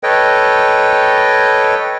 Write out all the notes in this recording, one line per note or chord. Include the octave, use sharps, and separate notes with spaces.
A4 B4 C#5 D#5 G5